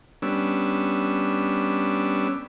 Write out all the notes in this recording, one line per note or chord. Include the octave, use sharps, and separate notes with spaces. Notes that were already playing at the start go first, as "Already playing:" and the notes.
G3 B3 C#4 D4 E6